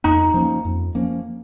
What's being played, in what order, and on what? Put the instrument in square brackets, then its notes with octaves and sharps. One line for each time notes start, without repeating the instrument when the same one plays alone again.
[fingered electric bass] F2 [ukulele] D#4
[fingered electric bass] F3 A#3 C#4
F2
F3 A#3 C#4